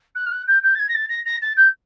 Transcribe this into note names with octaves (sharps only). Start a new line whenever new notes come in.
F#6
F6
F#6
G6
G6
A6
G#6
A#6
A6
A#6
A#6
A6
G6